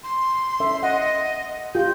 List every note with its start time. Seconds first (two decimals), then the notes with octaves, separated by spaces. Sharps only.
0.03 C6
0.60 C#4 A4 E5
0.83 D#5 F#5
1.75 F4 G4 G6